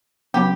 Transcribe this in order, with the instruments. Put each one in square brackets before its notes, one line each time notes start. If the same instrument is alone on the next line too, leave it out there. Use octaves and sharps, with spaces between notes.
[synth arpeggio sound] C#3 F#3 B3 [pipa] G4